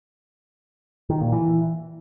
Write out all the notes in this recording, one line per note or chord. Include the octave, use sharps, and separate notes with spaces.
D#3
A#2
E3